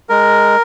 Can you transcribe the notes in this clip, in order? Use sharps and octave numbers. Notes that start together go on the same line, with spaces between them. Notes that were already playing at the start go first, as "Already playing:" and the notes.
G#3 A#4